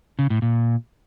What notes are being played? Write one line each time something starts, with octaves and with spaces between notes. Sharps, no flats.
C#3
A2
A#2